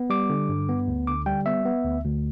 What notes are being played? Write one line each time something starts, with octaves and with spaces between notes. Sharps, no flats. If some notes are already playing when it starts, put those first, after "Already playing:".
Already playing: B3
G3 D6
D3
G2
B3
D2
D3 D6
G3 G5
B3 E5
B3
D2
D2